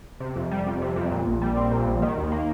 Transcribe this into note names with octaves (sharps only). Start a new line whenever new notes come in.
C3
F2
G3
F2
C3
F2
A#2
A#1
G3
C4
A#2
A#1
D#3
D#2
A#3